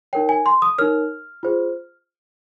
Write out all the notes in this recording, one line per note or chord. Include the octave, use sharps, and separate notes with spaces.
D#4 A#4 C#5 G5
G#5
C6
D#6
D#4 A#4 C#5 F6
F4 G#4 C5